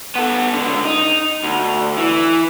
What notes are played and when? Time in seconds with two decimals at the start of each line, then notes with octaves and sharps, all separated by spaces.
0.15 B3 A4
0.53 C#2 D3
0.85 D#4
1.44 D2
1.98 E3